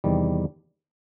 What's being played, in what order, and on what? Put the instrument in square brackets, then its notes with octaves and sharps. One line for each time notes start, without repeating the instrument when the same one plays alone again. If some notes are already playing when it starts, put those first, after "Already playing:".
[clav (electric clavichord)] E2 C3 D#3 G3